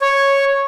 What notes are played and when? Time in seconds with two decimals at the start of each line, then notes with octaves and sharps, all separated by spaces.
0.02 C#5